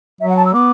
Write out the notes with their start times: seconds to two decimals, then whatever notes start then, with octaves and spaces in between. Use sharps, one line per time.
0.20 F#3 E5
0.29 F#5
0.37 A5
0.46 E6
0.54 B3 D6